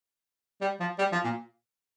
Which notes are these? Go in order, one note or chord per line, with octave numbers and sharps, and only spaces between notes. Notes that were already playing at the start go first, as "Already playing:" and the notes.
G3
F3
G3
F3
A#2